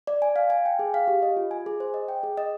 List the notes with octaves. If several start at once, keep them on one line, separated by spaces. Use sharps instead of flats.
D5
G#5
F5
G#5
G5
G#4
F5
G4
D#5
F4
G#5
G#4
C5
D#5
G5
G#4
D#5